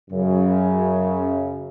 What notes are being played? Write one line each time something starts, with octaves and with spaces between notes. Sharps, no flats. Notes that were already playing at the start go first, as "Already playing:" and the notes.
F#2 C#3